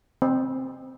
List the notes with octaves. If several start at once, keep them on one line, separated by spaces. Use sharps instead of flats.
C4